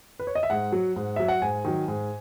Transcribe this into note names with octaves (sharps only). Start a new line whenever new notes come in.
B4
C#5
D#5
E5
G#2 F#5
F#3
G#2
F#3 E5
F#5
G#2 G#5
D#3 F#3
G#2